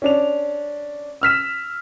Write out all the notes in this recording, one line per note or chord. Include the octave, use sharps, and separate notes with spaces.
C#4 D4 F7
E6 F6 B6 E7